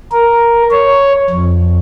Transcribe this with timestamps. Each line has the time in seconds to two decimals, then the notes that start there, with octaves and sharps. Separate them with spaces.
0.12 A#4
0.71 C#5
1.30 F2